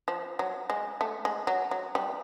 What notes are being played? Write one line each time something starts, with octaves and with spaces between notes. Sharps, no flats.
F3
F#3
G#3
A3
G#3
F#3
F#3
G3